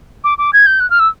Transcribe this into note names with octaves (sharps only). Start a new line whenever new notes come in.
D6
D6
G#6
G6
F#6
F6
E6